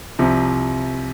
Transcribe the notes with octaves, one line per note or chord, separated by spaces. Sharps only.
C2 C3 F3